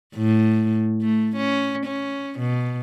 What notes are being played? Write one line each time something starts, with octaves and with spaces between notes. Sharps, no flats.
A2
A3
C#4
C#4
B2